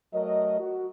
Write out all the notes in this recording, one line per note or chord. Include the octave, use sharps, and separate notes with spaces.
F#3 A3 A#4 D#5
F#4